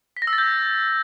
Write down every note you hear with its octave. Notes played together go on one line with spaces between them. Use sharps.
B6
A#6
E6
A6
G6